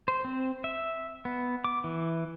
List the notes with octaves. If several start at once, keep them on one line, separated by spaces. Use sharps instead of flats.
C5
C4
E5
B3
D6
E3